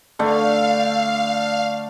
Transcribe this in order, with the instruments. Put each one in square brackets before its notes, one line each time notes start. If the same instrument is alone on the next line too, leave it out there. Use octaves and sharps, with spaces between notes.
[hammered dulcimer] D3 A3 D4 [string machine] F5